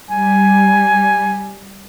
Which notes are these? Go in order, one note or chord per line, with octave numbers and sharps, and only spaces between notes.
G3 G#5